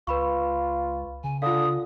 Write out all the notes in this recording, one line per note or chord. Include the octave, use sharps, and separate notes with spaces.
C#2 F4 B4 B5 C#6
C#3 G#5
D3 F4 F5 D#6